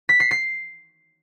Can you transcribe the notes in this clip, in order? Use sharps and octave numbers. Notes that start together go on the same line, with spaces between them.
B6
C7
C7